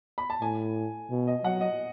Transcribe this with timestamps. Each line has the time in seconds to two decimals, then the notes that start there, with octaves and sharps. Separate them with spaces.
0.18 B5
0.30 A5
0.41 A2 G#5
1.10 B2
1.27 D#5
1.44 F#3 F#5
1.61 D#5